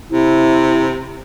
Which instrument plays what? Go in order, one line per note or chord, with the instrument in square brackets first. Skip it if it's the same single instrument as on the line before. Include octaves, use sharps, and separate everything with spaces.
[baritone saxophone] C3 [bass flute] E4